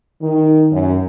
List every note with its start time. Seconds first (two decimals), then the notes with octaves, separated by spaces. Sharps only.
0.20 D#3
0.71 F#2